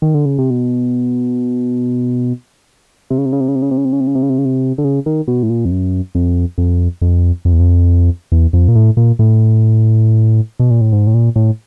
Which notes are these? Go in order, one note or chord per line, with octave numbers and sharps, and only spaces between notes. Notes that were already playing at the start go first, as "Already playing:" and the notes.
D#3
D3
C#3
C3
B2
C3
C#3
C3
C#3
C3
C#3
C3
C#3
C3
C#3
C3
C#3
C3
C#3
C3
C#3
C3
C#3
C3
D3
C#3
D#3
B2
A2
A#2
F2
F#2
F2
F2
F2
F2
E2
F2
E2
F2
A#2
A2
A#2
A2
B2
A#2
A2
G#2
A2
A#2
A2